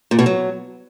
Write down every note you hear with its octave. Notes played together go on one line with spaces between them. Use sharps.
A#2
B2
F#3